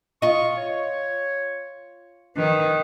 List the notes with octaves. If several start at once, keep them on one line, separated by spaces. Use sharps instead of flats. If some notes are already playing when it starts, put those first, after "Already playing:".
F4 D#5 C#6
C#5
D#3 B4